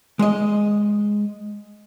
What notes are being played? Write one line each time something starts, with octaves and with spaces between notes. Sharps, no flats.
G#3 D#5